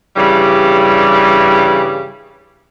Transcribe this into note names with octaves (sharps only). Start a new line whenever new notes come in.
G2 C#3 E3 G3